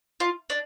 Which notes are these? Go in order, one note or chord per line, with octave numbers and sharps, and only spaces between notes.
F4
D4